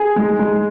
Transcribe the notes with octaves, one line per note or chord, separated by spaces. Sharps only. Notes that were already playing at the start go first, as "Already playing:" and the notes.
Already playing: G#4
G#3
G#3